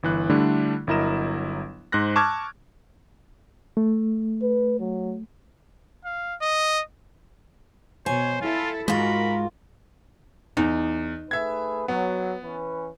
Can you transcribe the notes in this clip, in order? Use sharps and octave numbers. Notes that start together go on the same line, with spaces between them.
G1 E3 F#6
D3 G3 A3 D4 E4
G1 F#3 E4 A#4 D#5 E7
G#2 C5 F#6 A#6
A5 C#6 D6 E6 F6 G#6
A3
B4
F#3
F5
D#5
B2 C5 C#5 G#5
E4 F4 A4
G#2 G#3 F4 F#4 A#4 B5
E2 D#4
A3 G#4 B4 E5 G#6
F#3 B3
E3 C#4 B4